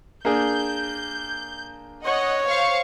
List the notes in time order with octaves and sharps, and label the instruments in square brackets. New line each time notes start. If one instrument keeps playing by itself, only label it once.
[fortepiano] A#3 D4 G#4 [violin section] G6
[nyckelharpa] C#5 [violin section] D#5 F#5
[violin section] C5 F5 C#6